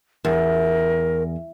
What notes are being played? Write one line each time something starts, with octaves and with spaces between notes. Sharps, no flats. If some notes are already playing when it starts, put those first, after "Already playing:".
E2 A#4